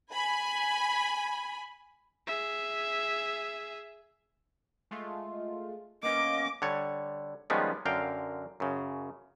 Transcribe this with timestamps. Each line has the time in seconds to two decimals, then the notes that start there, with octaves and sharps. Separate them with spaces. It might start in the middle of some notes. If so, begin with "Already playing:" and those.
0.12 G#5 B5
2.27 G#4 E5
4.91 G#3 A3 F4
6.03 A#3 B3 C#4 D#5 D6
6.62 D3 G3 C#5
7.50 D#3 F3 G3 G#3 B3 C#4
7.85 F#2 D3 A#4 F5 G5
8.60 F#2 C#3